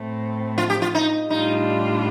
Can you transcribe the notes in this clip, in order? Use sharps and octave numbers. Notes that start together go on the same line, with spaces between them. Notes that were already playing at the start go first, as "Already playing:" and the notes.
Already playing: A2 A3 C4
F4
G4
F4
D#4
A2 G3 D4 D#4 F4